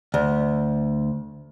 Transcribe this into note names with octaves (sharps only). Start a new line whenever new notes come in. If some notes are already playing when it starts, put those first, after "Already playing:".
D2